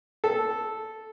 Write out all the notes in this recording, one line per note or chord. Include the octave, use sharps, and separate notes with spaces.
A4